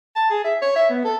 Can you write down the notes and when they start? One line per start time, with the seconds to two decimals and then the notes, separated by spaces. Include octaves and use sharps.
0.16 A5
0.30 G#4
0.44 E5
0.62 C#5
0.76 E5
0.90 B3
1.04 A4